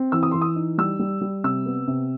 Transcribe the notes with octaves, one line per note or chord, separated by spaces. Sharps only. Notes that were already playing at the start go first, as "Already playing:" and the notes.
Already playing: C4
E3 E6
D#6
E3 C6
D#6
D#4
G3 E6
G3
G3
C3 E6
B3
C3